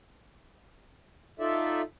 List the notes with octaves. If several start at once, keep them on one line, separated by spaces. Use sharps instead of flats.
D#4 F4 A4 D5 E5